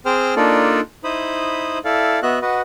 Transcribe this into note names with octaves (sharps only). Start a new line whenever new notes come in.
C4 G#4 C5 G5 F6
A#3 D4 D#4 F4 A4 D5
D#4 E4 C5 B5 D#6
E4 A4 D5 F5
B3 F#4 D#5 E5 F#6
F#4 B4 D#5 F#5